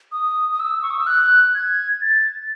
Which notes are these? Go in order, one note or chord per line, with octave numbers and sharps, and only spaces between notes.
D#6
D#6
E6
C#6
D#6
E6
F#6
G#6
A6